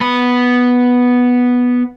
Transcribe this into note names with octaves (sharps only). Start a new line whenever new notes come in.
B3 B5